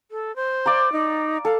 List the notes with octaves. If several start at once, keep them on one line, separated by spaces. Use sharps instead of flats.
A4
C5
D5 F5 A#5
D#4
A4 F5